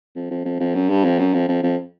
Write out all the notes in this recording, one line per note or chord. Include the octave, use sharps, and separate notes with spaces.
F2
F2
F2
F2
F#2
G2
F2
F#2
F2
F2
F2